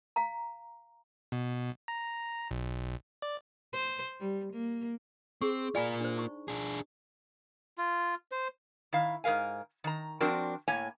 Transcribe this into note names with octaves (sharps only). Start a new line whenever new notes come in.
F5 A#5
B2
A#5
B1
D5
C5
G3
A#3
C4 G4 G#4 C#6
A#3 F4 D5 G#5 B5
D4 C5
D#4 C#6
D4 G#4
F4
C5
D#3 E4 F5
G#2 D#3 A#4 F5 G#5
D#3 A#5
F3 C4 D4 F#4 A#4
A2 A#3 C#5 G#5